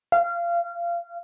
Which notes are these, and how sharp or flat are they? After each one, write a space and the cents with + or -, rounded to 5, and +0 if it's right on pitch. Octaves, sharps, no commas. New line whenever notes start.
F5 -25